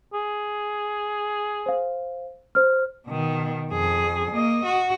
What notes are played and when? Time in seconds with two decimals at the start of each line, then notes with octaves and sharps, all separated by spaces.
0.14 G#4
1.66 C5 F5
2.55 C5 F6
3.07 B2 D#3
3.71 F2 G#4
4.31 A#3 D#5
4.65 F#4